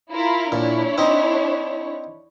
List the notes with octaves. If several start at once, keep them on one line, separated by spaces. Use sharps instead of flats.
E4 F4 A#4
A#2 D4 E4 C#5
C4 D#4